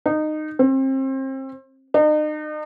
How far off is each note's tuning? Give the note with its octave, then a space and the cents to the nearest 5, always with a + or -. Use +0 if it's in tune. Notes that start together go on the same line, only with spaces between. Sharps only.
D#4 -20
C4 +30
D#4 -40